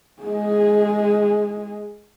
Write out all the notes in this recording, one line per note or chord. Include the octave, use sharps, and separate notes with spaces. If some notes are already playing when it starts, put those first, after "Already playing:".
G#3 G#4